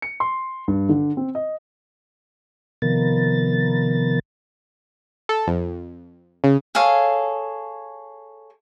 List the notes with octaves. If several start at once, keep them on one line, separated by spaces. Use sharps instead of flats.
C#7
C6
G2
D3
C4
D#5
C3 D#3 F3 B3 A#4 A6
A4
F2
C#3
G#4 A4 C#5 F5